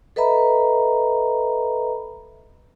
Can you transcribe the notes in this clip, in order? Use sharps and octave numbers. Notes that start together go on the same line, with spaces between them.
A4 B4 D#5 E5 A#5 B5